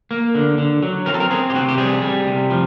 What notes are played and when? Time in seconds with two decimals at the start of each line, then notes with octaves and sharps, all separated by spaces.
0.11 A#3
0.35 D3
0.58 D3
0.83 F#3
1.06 C4 A#4
1.14 A4
1.20 A#4
1.30 C4 G#4
1.50 G4
1.55 C3 F#4
1.68 G4
1.78 G3 G#4
2.02 G3
2.27 C3
2.50 F3